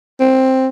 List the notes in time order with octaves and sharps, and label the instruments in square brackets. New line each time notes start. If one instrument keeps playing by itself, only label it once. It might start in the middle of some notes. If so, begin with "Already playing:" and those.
[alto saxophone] C4